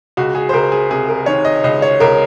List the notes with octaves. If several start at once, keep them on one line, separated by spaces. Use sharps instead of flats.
C#2 F#4
G#4
C5
C#2 A#4
G#4
C3 G#4
A#4
D#3 C#5
D#5
C#2 D#5
C#5
C#2 A#4